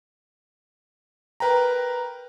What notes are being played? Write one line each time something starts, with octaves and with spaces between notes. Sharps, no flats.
A#4 B4 G5 A#5